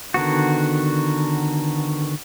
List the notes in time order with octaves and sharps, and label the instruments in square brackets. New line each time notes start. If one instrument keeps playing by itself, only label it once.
[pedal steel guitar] D3 D#3 B3 F#4